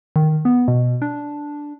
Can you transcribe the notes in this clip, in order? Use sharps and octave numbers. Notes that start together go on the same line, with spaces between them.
D#3
B3
B2
D4